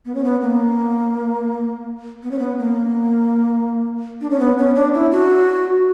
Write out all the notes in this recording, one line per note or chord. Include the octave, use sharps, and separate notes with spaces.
B3
C#4
B3
A#3
B3
C#4
B3
A#3
D4
C#4
B3
C#4
D4
E4
F#4